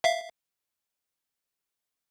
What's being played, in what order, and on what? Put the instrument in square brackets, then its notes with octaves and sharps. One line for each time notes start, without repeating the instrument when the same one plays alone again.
[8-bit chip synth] E5 F5